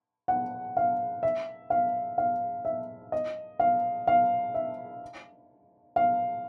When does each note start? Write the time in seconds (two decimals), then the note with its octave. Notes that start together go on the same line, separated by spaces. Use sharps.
0.28 F#5
0.77 F5
1.23 E5
1.70 F5
2.18 F5
2.65 E5
3.12 D#5
3.59 F5
4.07 F5
4.54 E5
5.96 F5